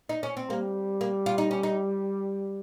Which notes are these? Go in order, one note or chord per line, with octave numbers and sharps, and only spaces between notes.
D#4
C#4
C4
G3 A#3
A#3
F4
D#4
C#4
D#4